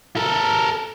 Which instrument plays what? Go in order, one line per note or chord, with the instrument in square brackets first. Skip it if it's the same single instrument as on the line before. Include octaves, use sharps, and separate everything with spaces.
[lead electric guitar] A4 A#4